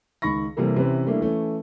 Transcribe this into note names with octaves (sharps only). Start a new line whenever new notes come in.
C#2 D#3 B5 C#6 A#6
C3 E3 G3 A#3 A4
C3 E3 C#4 B4
G3 A3 A#3 D4 E4
E3 A3 C#4